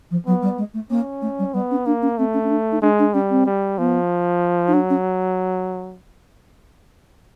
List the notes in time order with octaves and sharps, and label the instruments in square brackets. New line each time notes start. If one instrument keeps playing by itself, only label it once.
[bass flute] F3
[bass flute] F#3 [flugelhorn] B3
[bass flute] G3
G#3
A3
[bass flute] A#3 [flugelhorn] C#4
[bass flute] A3
G3
[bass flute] G3 [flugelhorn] B3
[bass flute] C#4
[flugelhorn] A#3 [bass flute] D4
[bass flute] C#4
[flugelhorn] A3 [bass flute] C4
[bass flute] C#4
C#4
D4
D#4
[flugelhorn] G#3 [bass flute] D4
[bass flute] D4
[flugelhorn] G3 [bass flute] C#4
[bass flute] C4
[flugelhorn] G3
[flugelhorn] F3 [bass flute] B3
[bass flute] D#4
[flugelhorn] F#3 [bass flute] D4
[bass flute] C#4